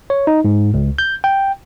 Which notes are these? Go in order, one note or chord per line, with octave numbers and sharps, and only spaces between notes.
C#5
D#4
G#2
C#2
G6
G5